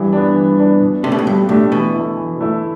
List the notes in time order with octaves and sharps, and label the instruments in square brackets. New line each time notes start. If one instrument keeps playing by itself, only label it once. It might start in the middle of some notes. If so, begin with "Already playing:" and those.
Already playing: [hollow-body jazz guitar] G2 [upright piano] E3
[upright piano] B3 D4
E3
B3 D4
B2
[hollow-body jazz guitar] C3 [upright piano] A3 D4 G4
[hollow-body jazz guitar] B2
A2
[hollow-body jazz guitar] G2 [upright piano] B2
[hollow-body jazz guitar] A2 [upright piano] A3 D4 G4
[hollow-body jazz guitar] B2 [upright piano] E3
[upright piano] A3 E4
E3
A3 E4